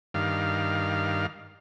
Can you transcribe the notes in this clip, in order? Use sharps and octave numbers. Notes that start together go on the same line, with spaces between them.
G2 D#3 F5